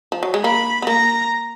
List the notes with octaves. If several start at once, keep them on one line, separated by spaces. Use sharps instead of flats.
F3
F#3
G#3
A#3 B5
B3
A#3 A#5